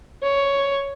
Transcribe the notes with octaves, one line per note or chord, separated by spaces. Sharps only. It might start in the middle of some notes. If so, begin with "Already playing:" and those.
C#5